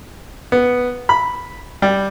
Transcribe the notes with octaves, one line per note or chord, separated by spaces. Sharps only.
B3
B5
G3